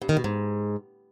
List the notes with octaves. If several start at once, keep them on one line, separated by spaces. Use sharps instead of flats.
G2
D#3
B2
G#2